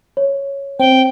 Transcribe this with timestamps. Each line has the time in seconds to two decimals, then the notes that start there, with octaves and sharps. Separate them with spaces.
0.17 C#5
0.80 C4 G5